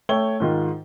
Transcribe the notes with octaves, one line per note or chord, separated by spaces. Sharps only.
A3 C#5 G5 G7
G#2 D#3 F4